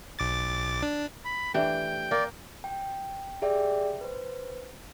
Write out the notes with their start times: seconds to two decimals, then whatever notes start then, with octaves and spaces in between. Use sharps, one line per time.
0.19 B1 D6 A6
0.83 D4
1.25 B5
1.54 E3 A3 D4 G4 G5
2.11 A#3 D5
2.64 G5
3.42 G4 G#4 D5 E5 G5
4.01 B4 C5